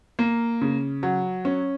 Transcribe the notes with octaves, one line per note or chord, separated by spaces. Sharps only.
A#3
C#3
F#3
C#4